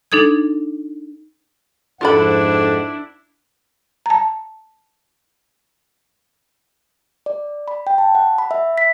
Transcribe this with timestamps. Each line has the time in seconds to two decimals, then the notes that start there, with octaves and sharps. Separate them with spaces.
0.12 D4 D#4 A4 D#6 G#6
2.01 F2 G#2 D4 E4 F4 A4 F#5 B5
4.06 A5 A#5
7.26 D5
7.68 B5
7.87 G5
7.98 A5
8.15 F#5
8.38 B5
8.51 E5
8.78 B6